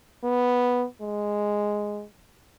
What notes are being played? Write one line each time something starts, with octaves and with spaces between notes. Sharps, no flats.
B3
G#3